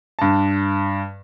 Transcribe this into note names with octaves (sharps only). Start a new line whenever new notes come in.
G2 A5